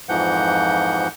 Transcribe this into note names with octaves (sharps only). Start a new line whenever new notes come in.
F2 G#2 E3 F3 F#5 G6